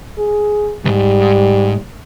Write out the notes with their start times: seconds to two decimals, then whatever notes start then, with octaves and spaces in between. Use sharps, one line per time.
0.18 G#4
0.85 C#2 G#2 G3